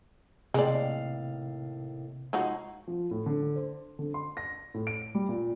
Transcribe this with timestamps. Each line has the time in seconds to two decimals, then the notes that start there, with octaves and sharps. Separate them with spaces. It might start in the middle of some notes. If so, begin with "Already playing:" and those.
0.54 D#2 A2 C3 G#3 D5 F5
2.33 F3 G#3 D#4 F#4
2.87 F3
3.11 A2
3.26 D3
3.56 C5
3.99 D3
4.14 C6
4.37 A#6
4.74 A2
4.87 D7
5.15 G3
5.29 A#2